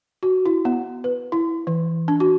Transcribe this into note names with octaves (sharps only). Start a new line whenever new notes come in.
F#4
E4
B3
B4
E4
E3
D4
F#4